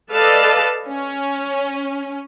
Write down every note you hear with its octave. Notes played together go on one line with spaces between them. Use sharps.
A4 B4 D5 D#5 F5 A5
C#4